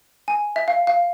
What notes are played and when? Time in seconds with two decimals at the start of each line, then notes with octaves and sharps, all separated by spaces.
0.28 G#5
0.56 E5
0.68 F5
0.87 F5